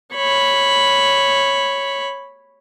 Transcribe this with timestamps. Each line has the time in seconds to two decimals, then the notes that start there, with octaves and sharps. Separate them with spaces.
0.14 C#5 B5